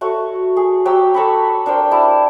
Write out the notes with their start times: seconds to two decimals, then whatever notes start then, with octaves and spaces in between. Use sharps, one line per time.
0.01 A3 F#4 C#5
0.57 G#4
0.85 F#3 G4 G5 E6
1.14 A4 C#5 A#5 B5
1.66 D4 A#4 C5 G5
1.91 E4 D5 A5